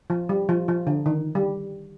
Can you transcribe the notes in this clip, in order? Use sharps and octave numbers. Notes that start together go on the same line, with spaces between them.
F3
G3
F3
F3
D3
D#3
G3